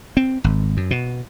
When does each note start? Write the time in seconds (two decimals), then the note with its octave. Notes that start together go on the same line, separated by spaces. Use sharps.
0.17 C4
0.44 G#1
0.77 F#2
0.91 B2